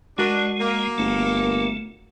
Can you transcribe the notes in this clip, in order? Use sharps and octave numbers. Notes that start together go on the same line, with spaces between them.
G#3 D4 F#4 A#4 D5
A#3
G1 A3